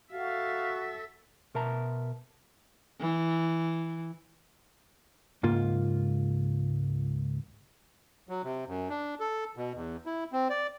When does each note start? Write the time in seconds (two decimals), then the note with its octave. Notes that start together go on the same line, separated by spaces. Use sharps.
0.13 F#4 A4 E5 F5
1.55 B2 A#4 E5 A5 A#5
3.00 E3
5.43 C#2 G#2 A#3 F4
8.29 F#3
8.43 C3
8.67 F#2
8.89 D4
9.20 A4
9.56 B2
9.74 E2
10.06 E4
10.32 C4
10.50 D5